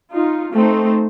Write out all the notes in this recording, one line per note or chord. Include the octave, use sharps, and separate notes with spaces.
D#4 F4
A3 C4 D#4 C5